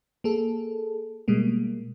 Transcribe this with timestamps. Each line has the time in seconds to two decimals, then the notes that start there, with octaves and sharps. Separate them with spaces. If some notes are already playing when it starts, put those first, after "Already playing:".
0.24 A#3 G#4 A4
1.28 B2 G3 G#3 A#3